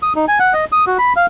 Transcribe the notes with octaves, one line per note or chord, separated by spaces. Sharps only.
D#6
D#4
G#5
F#5
D#5
D#6
F#4
B5
F5